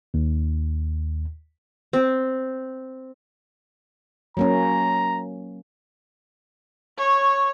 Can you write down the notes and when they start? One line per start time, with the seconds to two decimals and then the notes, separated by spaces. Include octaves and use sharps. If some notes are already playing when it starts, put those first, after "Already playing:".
0.14 D#2
1.93 C4
4.37 F#3 A#3 C#4 A#5
6.97 C#5 C#6